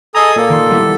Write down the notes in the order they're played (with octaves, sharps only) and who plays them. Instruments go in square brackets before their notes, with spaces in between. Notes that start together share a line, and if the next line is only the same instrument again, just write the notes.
[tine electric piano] G#4 D#5 A#5 [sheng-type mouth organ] A4 G#5 D#6
[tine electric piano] A#2 A#3 [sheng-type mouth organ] A4
[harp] D#3 C6
G3 B3 E4